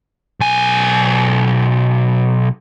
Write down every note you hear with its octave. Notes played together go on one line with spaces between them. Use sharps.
B1 G#5